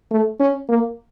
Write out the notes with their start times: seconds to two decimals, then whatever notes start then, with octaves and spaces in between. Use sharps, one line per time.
0.11 A3
0.40 C#4
0.69 A#3